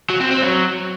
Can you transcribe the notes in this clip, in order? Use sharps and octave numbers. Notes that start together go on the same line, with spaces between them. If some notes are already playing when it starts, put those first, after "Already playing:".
F#3
C4
C4
F#3